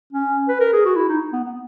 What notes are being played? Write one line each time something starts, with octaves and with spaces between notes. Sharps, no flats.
C#4
B4
A#4
G#4
F#4
E4
D#4
B3
B3